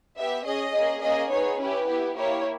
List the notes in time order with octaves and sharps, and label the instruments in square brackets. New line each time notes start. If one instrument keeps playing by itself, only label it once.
[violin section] B3 G4 E5
C#4 G#4 D#5
A#3 C#4 G#4
A#3 C#4 G#4 D#5
B3 D#4 G#4 C#5
C#4 E4 G4 B4
B3 E4 G4
A#3 E4 G4 C#5